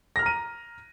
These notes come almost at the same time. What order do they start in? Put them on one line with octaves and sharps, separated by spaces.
A#6 F6 A#5 D#7